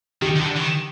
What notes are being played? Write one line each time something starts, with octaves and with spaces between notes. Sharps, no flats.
D#3 G4
D#3
D3
E3
D#3